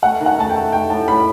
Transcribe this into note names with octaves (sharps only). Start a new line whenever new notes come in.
A3 F#5
D#3
F#5
A3 A5
G5
A3
A3 G5
A2 A5
A2 B5